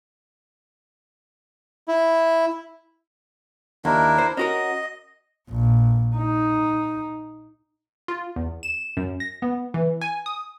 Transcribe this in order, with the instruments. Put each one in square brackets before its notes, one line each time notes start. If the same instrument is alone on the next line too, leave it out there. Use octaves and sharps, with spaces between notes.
[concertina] E4
[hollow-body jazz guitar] D#2 [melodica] D4 E4 A#4
[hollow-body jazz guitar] C5
[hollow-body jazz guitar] C#4 F#4 A#4 [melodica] D#5
[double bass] A#1
D#4
[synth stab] F4
E2
E7
F#2
A#6
B3
E3
G#5
D#6